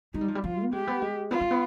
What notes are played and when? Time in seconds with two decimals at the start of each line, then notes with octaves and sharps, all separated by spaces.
0.14 G#3 D#4
0.21 G3
0.28 F3
0.35 G3
0.44 F3 F4
0.63 B3
0.72 G#3 G4
0.87 B3
1.02 G#3
1.31 B3 F4
1.41 G#3
1.51 B3